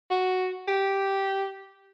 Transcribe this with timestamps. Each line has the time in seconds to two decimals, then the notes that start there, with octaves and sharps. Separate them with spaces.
0.10 F#4
0.68 G4